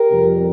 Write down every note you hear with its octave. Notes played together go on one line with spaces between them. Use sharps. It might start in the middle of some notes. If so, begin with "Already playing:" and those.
Already playing: G4 A#4
F2 C3 G3